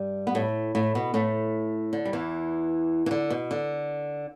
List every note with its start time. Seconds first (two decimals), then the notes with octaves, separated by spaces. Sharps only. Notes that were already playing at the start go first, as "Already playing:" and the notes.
Already playing: G2 G3
0.27 B3
0.35 A2 A3
0.75 A2 A3
0.95 B2 B3
1.14 A2 A3
1.93 D3
2.05 G3
2.13 E2 E3
3.06 E3
3.11 D3
3.30 B2
3.51 D3